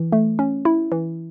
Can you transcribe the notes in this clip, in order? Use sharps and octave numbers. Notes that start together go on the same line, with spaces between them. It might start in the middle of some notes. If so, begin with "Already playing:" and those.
Already playing: E3
A3
C#4
E4
E3